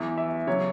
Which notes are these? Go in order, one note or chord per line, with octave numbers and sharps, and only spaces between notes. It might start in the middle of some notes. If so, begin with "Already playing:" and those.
Already playing: E2 E3
E5
C#3 F#3 C#5